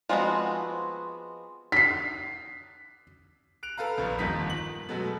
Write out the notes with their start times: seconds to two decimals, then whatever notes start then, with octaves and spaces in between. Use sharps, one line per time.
0.09 F3 G#3 B3 C4 F#4
1.72 B6 C7
3.63 F#6 D7 F7
3.78 A4 B4 F5 A#5
3.98 A#1 D#2 B3 B4
4.19 G1 F2 A#2 D#3 B6
4.50 F#7
4.89 B2 F#3 G#3 A3 B3